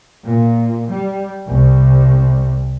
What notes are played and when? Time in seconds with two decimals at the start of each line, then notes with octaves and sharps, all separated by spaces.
0.24 A#2
0.91 G3
1.46 C2